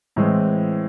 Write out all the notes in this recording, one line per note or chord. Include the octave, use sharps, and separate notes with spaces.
A2 E3 G#3 C4